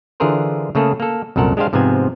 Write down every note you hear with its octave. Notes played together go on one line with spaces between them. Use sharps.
D3 E3 F4 G#4 A#4 C5
C#3 A3 A#3 G#4 A4
A#3 A4
C2 F#2 A#2 A4 A#4 F#5
G#3 D4 G4 G#4 C5 F5
G#2 C3 F3 B3 C4 G#5